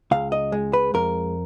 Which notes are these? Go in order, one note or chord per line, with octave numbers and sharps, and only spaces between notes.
C#2 F5
D#5
G#3
B4
F2 A#4